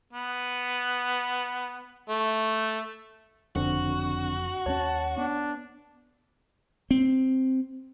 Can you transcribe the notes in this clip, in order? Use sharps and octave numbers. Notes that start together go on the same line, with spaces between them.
B3
A3
F#1 F2 D3 C4 D4 F#4
D#2 G3 C#4 C#5 A5
B3 D4
C4